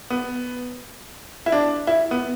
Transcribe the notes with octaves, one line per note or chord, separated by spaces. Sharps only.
B3
E4
D4
E4
B3